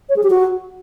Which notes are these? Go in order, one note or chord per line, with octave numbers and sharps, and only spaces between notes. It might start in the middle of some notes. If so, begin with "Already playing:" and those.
C#5
G#4
G4
F#4